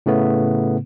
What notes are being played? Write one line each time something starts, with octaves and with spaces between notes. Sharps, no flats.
A2 C#3 A3 B3